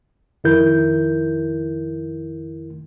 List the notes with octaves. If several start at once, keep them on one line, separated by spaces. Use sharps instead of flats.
F2 D#3 E4 A#4 G6